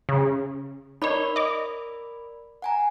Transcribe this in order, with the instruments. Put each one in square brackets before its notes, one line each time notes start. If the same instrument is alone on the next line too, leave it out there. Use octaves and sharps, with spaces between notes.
[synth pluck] C#3
[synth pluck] D#4 C#5 [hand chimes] A#4 D5 B5
[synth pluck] D#5 D6
[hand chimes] F#5 G#5 A#5